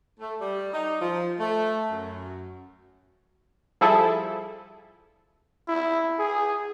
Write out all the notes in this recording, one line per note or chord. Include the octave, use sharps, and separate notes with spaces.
A3
G3
D#4
F3
A3
F#2
F3 G3 E4 G#4 A4
E4
G#4